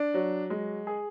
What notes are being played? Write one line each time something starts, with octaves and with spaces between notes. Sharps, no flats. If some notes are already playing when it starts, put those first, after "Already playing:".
Already playing: D4
F#3
G#3
G#4